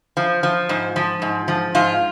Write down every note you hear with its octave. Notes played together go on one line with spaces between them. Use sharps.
F3
F3
G#2
F3
G#2
F3
G#2 F4